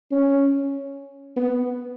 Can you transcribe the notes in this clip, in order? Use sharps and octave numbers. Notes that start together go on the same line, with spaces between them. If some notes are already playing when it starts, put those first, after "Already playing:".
C#4
B3